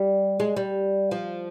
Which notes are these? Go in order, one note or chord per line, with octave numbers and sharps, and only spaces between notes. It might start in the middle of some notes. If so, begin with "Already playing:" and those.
Already playing: G3
G#3
G3
F3